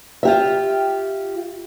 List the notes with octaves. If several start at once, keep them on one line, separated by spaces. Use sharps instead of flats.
F4 G4 E5